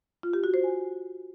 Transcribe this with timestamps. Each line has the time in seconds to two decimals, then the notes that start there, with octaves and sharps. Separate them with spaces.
0.23 F4
0.33 G4
0.44 F#4
0.54 C5
0.64 G#5